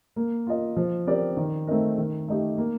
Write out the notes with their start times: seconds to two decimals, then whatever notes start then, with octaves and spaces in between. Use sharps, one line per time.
0.16 A#3
0.47 F4 A#4 D#5
0.76 F3
1.07 C4 G4 A#4 D5
1.37 D#3
1.67 A3 C4 D#4 A#4
1.98 D#3
2.28 A3 D#4 G4
2.58 A#3